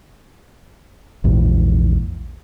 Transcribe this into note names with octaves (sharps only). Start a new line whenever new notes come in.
A#1 E2 G#2